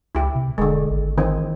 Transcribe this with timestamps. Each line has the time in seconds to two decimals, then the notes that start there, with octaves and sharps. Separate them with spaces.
0.15 C#2 E4 G4
0.35 C3
0.58 E1 D3 G#3
0.90 G#1
1.18 D#3 E3 C4